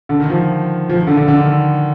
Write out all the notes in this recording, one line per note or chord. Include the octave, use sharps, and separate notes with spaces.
D3
D#3
F3
F3
D#3
D3
D3
D3
D#3